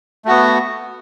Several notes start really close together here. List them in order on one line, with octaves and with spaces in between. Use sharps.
A3 F#4 B3